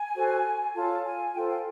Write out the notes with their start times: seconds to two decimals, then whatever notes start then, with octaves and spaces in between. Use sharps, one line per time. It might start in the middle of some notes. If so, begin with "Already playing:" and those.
Already playing: G#5
0.15 F#4 A4 C5
0.75 F4 A4 C#5 A5
1.05 G#5
1.34 F4 A4 C5 G5
1.49 G5